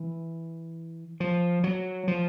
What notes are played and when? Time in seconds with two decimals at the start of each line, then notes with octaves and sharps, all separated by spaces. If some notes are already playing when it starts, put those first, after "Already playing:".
Already playing: E3
1.20 F3
1.64 F#3
2.08 F3